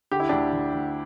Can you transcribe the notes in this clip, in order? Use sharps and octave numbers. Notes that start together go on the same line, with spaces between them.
D3 G4
E4
D2 D4 G4
D2
D2